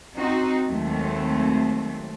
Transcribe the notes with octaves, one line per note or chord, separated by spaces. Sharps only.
C4 D#4 F#4
D#2 D#3 F#3 G#3 A3 C4